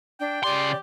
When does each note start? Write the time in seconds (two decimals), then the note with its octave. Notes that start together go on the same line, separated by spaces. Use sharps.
0.20 D4 G5
0.44 C#3 G4 D5 C6